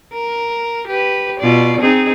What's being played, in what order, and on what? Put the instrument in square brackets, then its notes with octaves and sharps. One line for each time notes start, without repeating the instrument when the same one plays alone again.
[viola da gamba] A#4
G4 B4
B2 F4 D5
C4 D#4 G#4